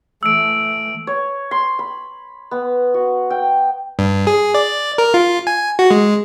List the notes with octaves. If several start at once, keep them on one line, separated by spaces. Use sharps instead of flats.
E3 A3 E6 D7
C#5
C6
B5
B3
F#4
G5
G2
G#4
D5
A#4
F4
G#5
F#4
G#3